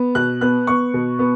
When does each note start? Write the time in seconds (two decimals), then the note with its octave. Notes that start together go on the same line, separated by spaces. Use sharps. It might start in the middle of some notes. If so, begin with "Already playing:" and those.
Already playing: B3
0.15 B2 F#6
0.41 B3 F#6
0.67 B3 C#6
0.94 B2
1.19 B3